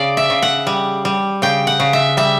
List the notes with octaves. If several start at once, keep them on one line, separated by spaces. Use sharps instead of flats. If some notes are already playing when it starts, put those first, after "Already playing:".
Already playing: C#3 D5
E5
C#3
F#5
G3
G3
C#3 G5
F#5
C#3
E5
G3 E5